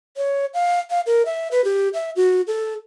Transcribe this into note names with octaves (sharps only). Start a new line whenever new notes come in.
C#5
F5
F5
A#4
E5
B4
G4
E5
F#4
A4